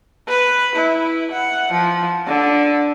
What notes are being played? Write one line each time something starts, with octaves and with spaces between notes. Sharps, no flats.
B4
E4
F#5
F3
D3